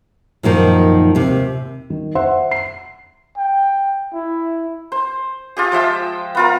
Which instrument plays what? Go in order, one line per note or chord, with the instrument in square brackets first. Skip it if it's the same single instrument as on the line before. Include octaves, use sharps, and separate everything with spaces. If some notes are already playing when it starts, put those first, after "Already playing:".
[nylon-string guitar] F#2 A#2 D#3 F3
D#2 C3
[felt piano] D#3
C5 E5 F#5 C6
C7
[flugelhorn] G5
E4
[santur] C5
F4 G4 G#4
F3 G#3 E5 G5
B3 F4 A#4